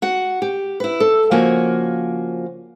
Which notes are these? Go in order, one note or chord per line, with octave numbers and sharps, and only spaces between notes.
F#4 F#5
G4
E4 B4
A4
C#3 F3 A#3 F#4 G#5